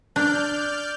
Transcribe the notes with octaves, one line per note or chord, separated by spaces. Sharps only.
D4 D5 F6 G6